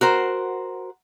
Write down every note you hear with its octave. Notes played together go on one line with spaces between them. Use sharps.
F#4 A#4 C5